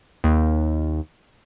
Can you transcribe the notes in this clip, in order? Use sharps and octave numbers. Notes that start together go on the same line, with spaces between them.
D#2